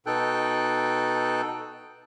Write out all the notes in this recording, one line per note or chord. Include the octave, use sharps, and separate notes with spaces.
B2 D#4 A4 G5 F#6